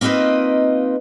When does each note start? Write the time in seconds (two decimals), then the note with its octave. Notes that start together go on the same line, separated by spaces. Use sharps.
0.01 A#3 C4 D#4 F4 B4 D#5